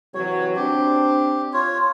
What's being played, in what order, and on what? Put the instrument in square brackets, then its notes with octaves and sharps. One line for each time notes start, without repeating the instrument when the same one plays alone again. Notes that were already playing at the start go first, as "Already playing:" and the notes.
[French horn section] C3 E3 F#3 [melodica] C#5
[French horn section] C4 D4 [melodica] G4
[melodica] F4 C#5